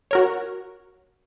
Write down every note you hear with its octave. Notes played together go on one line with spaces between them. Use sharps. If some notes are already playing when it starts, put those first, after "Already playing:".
F#4 A#4 C#5